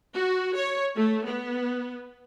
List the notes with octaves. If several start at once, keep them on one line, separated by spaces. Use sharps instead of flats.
F#4
C#5
A3
B3